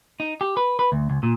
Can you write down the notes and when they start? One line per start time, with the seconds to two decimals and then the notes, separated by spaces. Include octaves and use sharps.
0.20 D#4
0.41 G4
0.57 B4
0.79 B4
0.92 D2
1.10 C#2
1.23 A#2